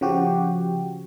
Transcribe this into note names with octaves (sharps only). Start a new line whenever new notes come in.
C#3 F3 F#4 G4